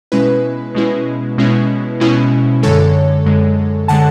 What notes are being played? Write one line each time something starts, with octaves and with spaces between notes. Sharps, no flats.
B2 G#3 C#4 E4 B4
B2 G#3 C#4 E4
B2 G#3 C#4 E4
B2 G#3 C#4 E4
F#2 D3 G#3 A4 C#5
F#2 D3 G#3
D3 G#3 F#5 A5